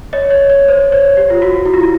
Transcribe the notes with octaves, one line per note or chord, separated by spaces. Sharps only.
C#5 D#5
C#5
C#5
C5
C#5
G4
F4
F#4
E4
F4
E4